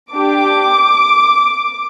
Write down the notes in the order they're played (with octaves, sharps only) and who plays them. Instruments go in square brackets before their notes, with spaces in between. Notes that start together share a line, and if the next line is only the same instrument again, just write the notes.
[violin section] D4 G4 D6